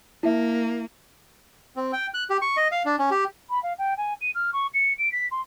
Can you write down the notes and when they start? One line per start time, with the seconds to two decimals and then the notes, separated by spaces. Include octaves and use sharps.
0.23 A#3 E4 E5
1.76 C4
1.93 G5
2.14 F#6
2.30 G4
2.42 C#6
2.57 D#5
2.72 F5
2.86 D4
2.99 C#4
3.11 G4
3.50 B5
3.63 F5
3.78 G5
3.97 G#5
4.21 D#7
4.35 F6
4.53 C#6
4.74 C#7
4.98 D7
5.12 B6
5.31 C6